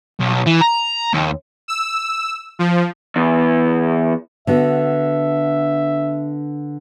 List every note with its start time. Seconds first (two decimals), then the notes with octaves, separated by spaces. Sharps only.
0.20 B1
0.47 E3
0.61 A#5
1.14 D#2
1.68 E6
2.59 F3
3.16 E2
4.47 D3 B3 F#4 E5